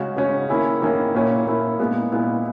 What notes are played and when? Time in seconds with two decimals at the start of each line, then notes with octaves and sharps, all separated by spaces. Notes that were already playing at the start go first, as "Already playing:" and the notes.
Already playing: C#3 G#3 C#4 F#4
0.16 C#3 G#3 C#4 F#4
0.49 D#3 A#3 C#4 E4 G#4
0.82 D#3 A#3 C#4 E4 G#4
1.15 A#2 A#3 C#4 E4
1.47 A#2 A#3 C#4 E4
1.79 A#2 G#3 B3 E4
2.12 A#2 G#3 B3 E4